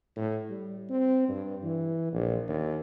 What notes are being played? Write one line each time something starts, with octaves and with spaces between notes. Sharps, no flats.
A2
G3
C4
G2
E3
A#1
D#2